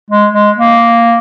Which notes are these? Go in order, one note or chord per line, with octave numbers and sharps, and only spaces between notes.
G#3
G#3
A#3